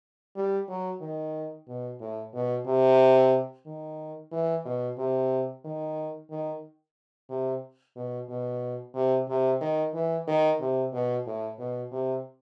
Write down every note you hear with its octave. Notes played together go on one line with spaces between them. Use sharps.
G3
F#3
D#3
B2
A2
B2
C3
D#3
E3
B2
C3
D#3
D#3
C3
B2
B2
C3
C3
D#3
E3
D#3
C3
B2
A2
B2
C3